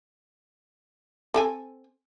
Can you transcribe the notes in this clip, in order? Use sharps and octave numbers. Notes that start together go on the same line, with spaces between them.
C4 A4 G#5